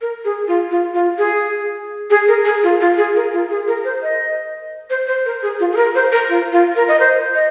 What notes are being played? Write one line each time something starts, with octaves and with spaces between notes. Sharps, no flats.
A#4
G#4
F4
F4
F4
G#4
G#4
A#4
G#4
F4
F4
G#4
A#4
F4
G#4
A#4
C5
D#5
C5
C5
A#4
G#4
F4
G#4
A#4
C5
A#4
F4
F4
A#4
D#5
C5
D#5